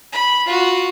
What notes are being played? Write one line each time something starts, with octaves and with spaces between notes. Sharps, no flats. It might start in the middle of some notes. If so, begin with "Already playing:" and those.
B5
F4 F#4